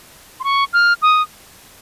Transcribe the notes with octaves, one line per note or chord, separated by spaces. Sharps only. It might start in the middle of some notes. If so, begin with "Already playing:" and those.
C6
C#6
F6
D#6